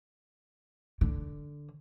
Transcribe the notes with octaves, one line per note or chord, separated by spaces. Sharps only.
D3